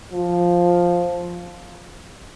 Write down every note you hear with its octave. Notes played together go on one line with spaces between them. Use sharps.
F3